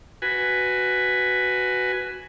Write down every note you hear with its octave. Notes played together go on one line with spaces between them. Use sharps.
F#4 B4 G#5